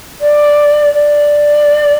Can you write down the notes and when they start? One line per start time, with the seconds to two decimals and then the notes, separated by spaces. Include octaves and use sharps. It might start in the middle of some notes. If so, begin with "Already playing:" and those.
0.20 D5
0.92 D5